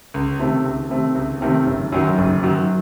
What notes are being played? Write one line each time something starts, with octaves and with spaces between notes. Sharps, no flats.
C#2
C3 D#3 A3 C4
C#2
C3 D#3 A3 C4
C#2
C3 D#3 A3 C4
F#1
F#2 D#3 F#3
F#1
F#2 D#3 F#3